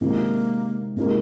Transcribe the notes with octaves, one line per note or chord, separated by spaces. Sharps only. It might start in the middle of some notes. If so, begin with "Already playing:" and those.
C3 D#3 G#3 A#3 D#4
C3 G#3 A#3 D#4 A#4